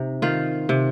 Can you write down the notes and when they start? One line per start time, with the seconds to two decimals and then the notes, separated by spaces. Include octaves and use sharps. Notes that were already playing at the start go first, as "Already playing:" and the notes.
Already playing: C3 D#4
0.22 D#3 F4
0.69 C3